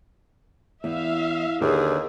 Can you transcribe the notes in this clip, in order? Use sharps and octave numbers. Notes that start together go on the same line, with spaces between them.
E2 E5 F5
D#2 D3 G#4 B4